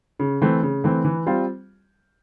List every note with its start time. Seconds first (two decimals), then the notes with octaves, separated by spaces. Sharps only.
0.19 C#3
0.41 E3 A3 C4
0.63 C#3
0.84 E3 A3 C4
1.05 E3
1.26 G3 C4 F4